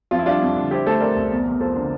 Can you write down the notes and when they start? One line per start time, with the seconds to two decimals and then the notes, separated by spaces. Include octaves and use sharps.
0.11 F2 F4
0.19 E4
0.26 G3 D4 F4
0.41 F2
0.56 D3
0.71 C4 E4 G4
0.86 A3 A4 C5
1.01 C4 A#4 D5
1.16 C2
1.31 E2
1.46 E2
1.60 F3 A4 C5
1.75 D3